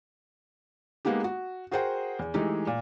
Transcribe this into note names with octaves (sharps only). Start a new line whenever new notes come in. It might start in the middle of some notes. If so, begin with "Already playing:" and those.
G#3 A#3 B3 D#4 G4
F#4
F#4 G#4 A#4 C5 F#5 G5
E2
E3 G#3 A3 D#4 G4
A#2